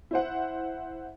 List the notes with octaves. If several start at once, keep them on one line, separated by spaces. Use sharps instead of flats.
E4 C5 F#5